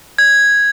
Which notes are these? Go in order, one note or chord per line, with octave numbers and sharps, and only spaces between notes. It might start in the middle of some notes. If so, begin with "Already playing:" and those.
G#6